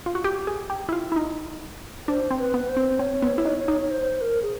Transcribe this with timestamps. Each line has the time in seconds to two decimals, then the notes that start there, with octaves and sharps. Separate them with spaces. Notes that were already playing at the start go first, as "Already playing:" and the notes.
0.06 F4
0.15 F#4
0.24 G4
0.47 G#4
0.70 G4
0.89 E4
0.92 F4
1.12 E4
1.16 D#4
2.08 D4 C5
2.31 C4
2.38 B4
2.54 B3
2.69 C5
2.77 C4
2.99 C4 C#5
3.22 B3
3.38 E4
3.45 D#4
3.68 D#4
3.91 C5
4.21 A#4
4.42 G#4